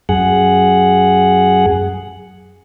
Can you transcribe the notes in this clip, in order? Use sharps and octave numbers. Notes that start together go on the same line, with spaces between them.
F#2 G#4 F#5